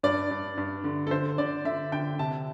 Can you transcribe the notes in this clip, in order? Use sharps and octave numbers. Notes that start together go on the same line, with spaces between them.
G2 D5
G2
G2
D3
A4
D3 C5
D3 D5
D3 E5
D3 G5
C3 A5